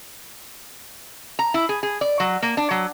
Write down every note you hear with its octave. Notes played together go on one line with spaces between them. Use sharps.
A#5
E4
G#4
G#4
D5
F#3
A#3
D4
F#3